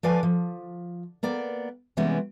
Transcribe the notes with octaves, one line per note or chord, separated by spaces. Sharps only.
F3 B4 D5 F5 G#5
F3
A#3 B3 D5 G5
C3 E3 G3 G#3 B3 C#4